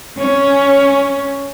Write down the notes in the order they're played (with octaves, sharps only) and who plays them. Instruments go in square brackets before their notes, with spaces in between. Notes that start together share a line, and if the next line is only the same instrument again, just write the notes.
[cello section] C#4